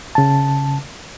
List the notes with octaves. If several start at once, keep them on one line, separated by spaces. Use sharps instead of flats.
C#3 A5